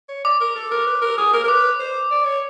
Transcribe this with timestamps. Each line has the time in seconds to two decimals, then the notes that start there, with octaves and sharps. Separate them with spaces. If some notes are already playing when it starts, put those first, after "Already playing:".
0.09 C#5
0.24 D5 D6
0.40 A#4
0.56 A4
0.71 A#4
0.87 B4
1.02 A#4
1.18 G#4
1.33 A#4
1.44 A#4
1.48 B4 D6
1.79 C5
2.11 D5
2.24 C#5